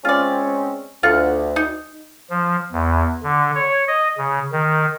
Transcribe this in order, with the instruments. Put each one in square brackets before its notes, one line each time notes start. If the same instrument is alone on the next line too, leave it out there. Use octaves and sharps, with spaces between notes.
[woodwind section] G#3 C4 C#4 [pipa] F4 D5
[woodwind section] D2 [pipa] F4 F#5
[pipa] D#4
[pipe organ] F3
E2
D3
C#5
D#5
C#3
D#3